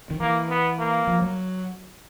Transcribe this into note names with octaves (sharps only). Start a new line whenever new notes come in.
D#3
E3 A#3
B3
A#3
F3
F#3